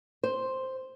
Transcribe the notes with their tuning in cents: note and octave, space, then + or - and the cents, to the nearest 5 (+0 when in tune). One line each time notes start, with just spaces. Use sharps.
C5 +0